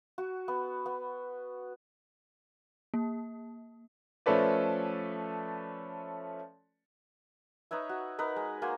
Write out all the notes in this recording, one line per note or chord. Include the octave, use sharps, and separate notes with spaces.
F#4
B3
B3
A#3
F3 A3 C#4 A4 B4 D5
D#4 B4 C#5 E5
F#4
D#4 A#4 B4 D#5
G#3
A#3 F#4 C5 G#5